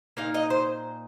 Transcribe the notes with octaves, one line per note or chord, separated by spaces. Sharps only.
A#2 A#3 D#4 F5
D#5
C5